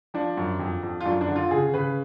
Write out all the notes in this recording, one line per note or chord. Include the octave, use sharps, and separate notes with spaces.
F3 D4
F#2
F2
F2
F4
F#2 D4
D4
D3
F4
C#3 G#4
C#3 B4